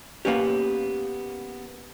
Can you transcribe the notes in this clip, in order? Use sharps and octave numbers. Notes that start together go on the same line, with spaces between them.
A#3 B3 C#4 G4